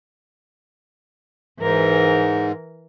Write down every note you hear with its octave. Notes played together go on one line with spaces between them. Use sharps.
G#2 E3 A#4